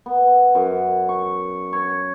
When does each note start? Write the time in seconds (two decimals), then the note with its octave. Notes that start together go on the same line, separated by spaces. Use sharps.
0.06 B3
0.55 F#2
1.09 C#6
1.73 C#5